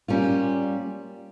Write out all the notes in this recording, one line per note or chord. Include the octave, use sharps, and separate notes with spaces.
G3 A#3 C#4 F4